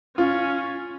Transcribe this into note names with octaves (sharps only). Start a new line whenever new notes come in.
C#4 F4